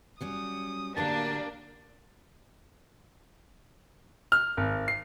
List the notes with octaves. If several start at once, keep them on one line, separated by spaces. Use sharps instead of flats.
F#3 G3 C#4 D#6
A2 D3 F#3 A#3 D4 G4 A5
F6
G#1
C7